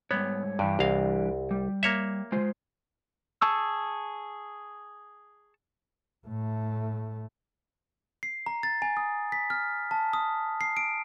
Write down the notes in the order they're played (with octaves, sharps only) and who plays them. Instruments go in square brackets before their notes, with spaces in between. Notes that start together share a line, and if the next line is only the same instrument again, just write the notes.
[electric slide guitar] G#2 G3 C#5 [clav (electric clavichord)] B3
[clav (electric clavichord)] G2 [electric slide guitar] E3 G3 D4
[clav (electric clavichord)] C2 F5
[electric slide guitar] G3
[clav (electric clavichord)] A#3 C#5 E5
[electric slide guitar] G#3 F4 C5
[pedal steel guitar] G#4 A5 C#6 E6
[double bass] A2 A3
[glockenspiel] C7
A#5
A6
G#5
D#6
B6
F6
A5
D#6
C7
D7